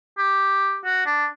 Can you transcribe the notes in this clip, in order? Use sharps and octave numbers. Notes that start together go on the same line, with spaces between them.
G4
F#4
D4